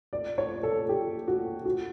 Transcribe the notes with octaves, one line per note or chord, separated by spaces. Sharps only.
D5
C#5
A4
G4
F#4
F#4